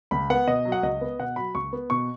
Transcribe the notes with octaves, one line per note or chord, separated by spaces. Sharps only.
C#2 B5
B3 F#5
B2 D#5
F#3
F#5
C#2 D#5
B3
B2 F#5
F#3 B5
C#2 C#6
B3
B2 C#6